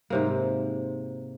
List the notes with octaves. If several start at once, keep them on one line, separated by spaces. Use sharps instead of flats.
G#2 C3 A#3